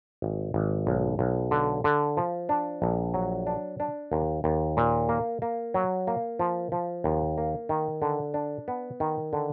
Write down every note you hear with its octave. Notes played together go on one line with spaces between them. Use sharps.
G#1
G#1
B1
B1
D3
D3
F3
D4
A#1
F#3
D4
D4
D#2
D#2
A#2
A#3
A#3
F#3
A#3
F3
F3
D#2
A#3
D#3
D3
D4
B3
D#3
D3